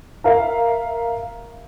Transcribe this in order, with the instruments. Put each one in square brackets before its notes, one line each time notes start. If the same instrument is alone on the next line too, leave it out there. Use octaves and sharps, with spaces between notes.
[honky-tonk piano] A#4 E5 F5